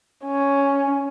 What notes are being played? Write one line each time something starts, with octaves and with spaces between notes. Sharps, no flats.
C#4